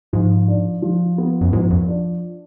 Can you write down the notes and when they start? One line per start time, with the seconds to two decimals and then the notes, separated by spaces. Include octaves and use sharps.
0.13 G#2 F3
0.48 D4
0.82 F3
1.18 B3
1.41 F#2
1.53 G#2 F3
1.70 F#2
1.87 D4